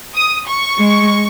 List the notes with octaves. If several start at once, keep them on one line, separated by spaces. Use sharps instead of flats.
D#6
C#6
G#3